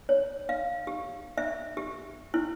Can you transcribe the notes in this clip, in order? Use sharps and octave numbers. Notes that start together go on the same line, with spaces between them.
C#5
F5
G4
E5
G4
E4